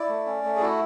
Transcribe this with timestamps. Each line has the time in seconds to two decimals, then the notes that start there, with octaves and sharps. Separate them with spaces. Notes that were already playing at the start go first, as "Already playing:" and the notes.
Already playing: E4 D5
0.09 A3
0.26 C#4
0.44 A3
0.56 G#4
0.61 E4 F#4